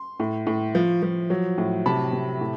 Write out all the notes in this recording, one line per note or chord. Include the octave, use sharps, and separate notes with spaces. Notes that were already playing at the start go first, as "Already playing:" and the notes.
Already playing: C6
A2
A2
F3
F3
F#3
A2
C3 A5 B5
C3
A2